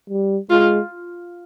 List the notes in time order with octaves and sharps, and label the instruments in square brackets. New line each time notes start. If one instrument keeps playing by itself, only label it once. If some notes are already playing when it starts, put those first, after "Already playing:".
[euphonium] G3
[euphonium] G#3 [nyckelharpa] F4